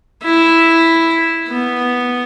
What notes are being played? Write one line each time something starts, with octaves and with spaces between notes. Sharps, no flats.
E4
B3